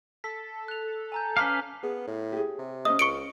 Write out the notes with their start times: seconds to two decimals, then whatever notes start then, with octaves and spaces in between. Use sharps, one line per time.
0.24 A4 B6
0.68 F#6 F7
1.12 G#5 A#5 G6
1.37 C#4 B4 F5 A5 D6 B6
1.83 B3 G#4
2.07 A2
2.32 G4 G#4
2.59 C3
2.85 C#4 C5 D#5 D#6
2.99 C#2 C#6 C#7 D7